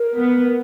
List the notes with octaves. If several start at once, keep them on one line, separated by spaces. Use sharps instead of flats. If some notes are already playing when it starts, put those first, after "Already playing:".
Already playing: A#4
B3